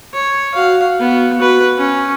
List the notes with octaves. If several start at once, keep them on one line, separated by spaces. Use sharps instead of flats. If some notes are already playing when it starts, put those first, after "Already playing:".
C#5
F#4 F5
B3 F#4
F#4 B4
C#4